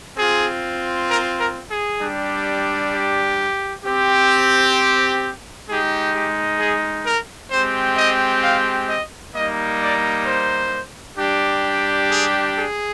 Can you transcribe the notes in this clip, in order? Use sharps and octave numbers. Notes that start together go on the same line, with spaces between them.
C4 F4 G#4
A#4
A#4
G#4
G3 D4 G4
G4
C4 G4
G#3 D#4 G4 G#4
G4
G#4
A#4
G#3 C4 G4 C5
D#5
F5
D#5
G3 A#3 D#4 D#5
D5
C5
G3 D4 G4
G#4
G#4